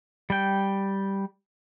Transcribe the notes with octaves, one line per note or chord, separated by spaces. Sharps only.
G3 G5